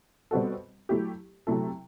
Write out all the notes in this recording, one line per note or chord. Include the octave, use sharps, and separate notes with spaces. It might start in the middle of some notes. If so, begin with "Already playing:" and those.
B2 G3 C4 F#4 A4
F#3 A3 E4 G4
C3 F#3 A3 E4 A4